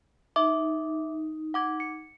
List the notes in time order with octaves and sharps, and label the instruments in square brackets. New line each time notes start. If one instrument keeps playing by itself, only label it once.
[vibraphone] D#4 [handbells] E5 D6
[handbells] F#5 D6 G#6
C#7